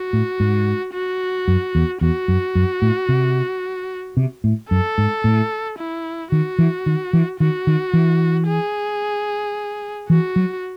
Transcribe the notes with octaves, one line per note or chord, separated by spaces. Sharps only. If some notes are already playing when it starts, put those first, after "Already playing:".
Already playing: F#4
A2
G#2
F#4
F#2
E2
E2 F#4
F#2
F#2
A2
C3
C3
A2
F#2 A4
G#2
A2
E4
D#3 F#4
E3
D#3
E3
D#3 F#4
D#3
E3
G#4
E3 F#4
F#3